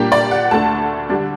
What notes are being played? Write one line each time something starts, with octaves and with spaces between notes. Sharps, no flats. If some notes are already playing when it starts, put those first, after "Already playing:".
Already playing: A#2 G3 A#3 D4 G4
D5
F#5
D2 D3 A3 D4 A5
D3 G3 D4